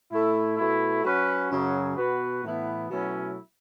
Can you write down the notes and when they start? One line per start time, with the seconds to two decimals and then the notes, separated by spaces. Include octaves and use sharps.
0.11 A2 A3 E4
0.57 B2 A3 E4
1.04 F#3 C#4 F#4 B4
1.51 F#2 C#3 F#3 C#4 F#4
1.97 B2 B3 F#4 B4
2.44 A2 E3 B3 E4
2.90 B2 F#3 A3 C#4 E4